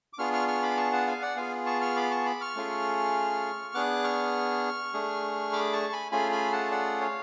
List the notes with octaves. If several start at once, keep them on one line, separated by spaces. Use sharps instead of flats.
D6
B3 D4 F4 G#4 C#6 F6
C#6 F6
C#6 F6
B5 D6
A5 C#6
F#5 A5
F5 G#5
D5 F#5
B3 F4 G#4 F5 G#5
A5 C#6
C#6 F6
B5 D6
A5 C#6
B5 D6
C#6 F6
A3 C#4 F4 G#4
B3 D4 G#4 D6 F#6
C#6 F6
A3 D4 G#4
B5 D6
A5 C#6
G#5 B5
A3 C#4 F4 G#4 G#5 B5
G#5 B5
F#5 A5
D5 F#5
C#5 F5